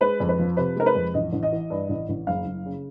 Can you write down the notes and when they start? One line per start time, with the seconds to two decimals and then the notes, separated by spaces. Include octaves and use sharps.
0.01 G#3 B4
0.20 F2
0.29 B4
0.39 F3
0.57 C3 B4
0.76 G#3 A#4
0.86 B4
0.95 F2
1.14 A1 D#5
1.32 A1
1.43 D#5
1.52 E3
1.70 G2
1.89 A1
2.09 A1
2.27 F#1 F5
2.46 F#1
2.66 C#3